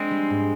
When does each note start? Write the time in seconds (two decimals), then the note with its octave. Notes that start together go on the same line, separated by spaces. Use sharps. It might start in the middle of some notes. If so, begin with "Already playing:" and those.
Already playing: G#3 C4 D4
0.11 G3
0.30 G#2